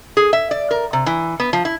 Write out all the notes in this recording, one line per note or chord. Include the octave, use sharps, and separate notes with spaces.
G#4
E5
D5
A#4
C3
E3
B3
F3
E4